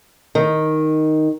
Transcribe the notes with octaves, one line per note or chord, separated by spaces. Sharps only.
D#3